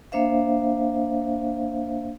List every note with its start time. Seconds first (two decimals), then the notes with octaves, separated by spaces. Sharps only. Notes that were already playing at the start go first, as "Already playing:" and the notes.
0.12 A#3 D4 C5 E5 F5